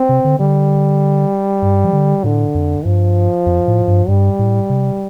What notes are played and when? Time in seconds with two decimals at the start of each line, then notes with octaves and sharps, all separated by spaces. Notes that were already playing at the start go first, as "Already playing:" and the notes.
Already playing: C4
0.09 C3
0.25 D3
0.40 D3 G3
1.62 G2
1.85 F3
1.93 D3
2.24 A2 D3
2.55 F2
2.85 G2 F3
3.46 F2
3.68 A2
3.88 G2
4.08 G2 G3
4.39 A2
4.70 C3